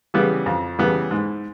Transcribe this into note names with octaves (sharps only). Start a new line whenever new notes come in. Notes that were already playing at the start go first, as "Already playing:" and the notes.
C#3 E3 G3 B3
F2
C#3 E3 G3 B3
G#2